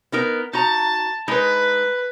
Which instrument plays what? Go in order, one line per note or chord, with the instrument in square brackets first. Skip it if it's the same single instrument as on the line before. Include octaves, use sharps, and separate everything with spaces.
[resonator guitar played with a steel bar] B3 D#4 A#4
[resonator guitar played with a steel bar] D#4 F#4 A#5 [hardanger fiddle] A5
[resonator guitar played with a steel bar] G#3 D#4 [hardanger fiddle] B4